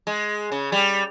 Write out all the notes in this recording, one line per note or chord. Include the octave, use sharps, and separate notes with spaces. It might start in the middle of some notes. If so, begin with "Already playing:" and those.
G#3
C#3
G3